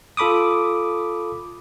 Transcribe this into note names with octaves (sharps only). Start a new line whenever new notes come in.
F4 A4 B5 D6 D#6